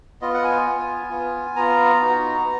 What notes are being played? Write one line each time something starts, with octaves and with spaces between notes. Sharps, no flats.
B3 F4 D#5
F#5
G#5
B3 F4
B3 F4
B3 F4 A#5
B3 D#4 F#4
B3